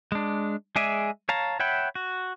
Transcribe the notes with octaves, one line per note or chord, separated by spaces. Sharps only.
G#3 D4
G#3 G#4 D5 E5 G#5
C#5 F5 A5 A#5
C#5 E5 F#5 G5 B5
F#4